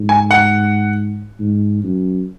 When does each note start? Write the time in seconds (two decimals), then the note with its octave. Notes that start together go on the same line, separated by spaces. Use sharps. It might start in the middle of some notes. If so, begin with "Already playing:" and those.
Already playing: G#2
0.09 G#5
0.31 F#5
1.40 G#2
1.83 F#2